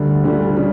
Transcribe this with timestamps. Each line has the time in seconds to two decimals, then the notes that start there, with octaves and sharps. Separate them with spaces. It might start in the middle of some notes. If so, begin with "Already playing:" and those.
Already playing: D2 D3 G3
0.23 D2 D3 G3
0.56 C#3 G3